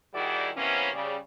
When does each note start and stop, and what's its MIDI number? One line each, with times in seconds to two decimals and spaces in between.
0.14 0.49 51
0.14 0.49 55
0.14 0.49 64
0.14 0.49 66
0.14 0.49 68
0.14 0.49 74
0.57 0.89 48
0.57 0.89 52
0.57 0.89 58
0.57 0.89 59
0.57 0.89 61
0.93 1.17 49
0.93 1.17 55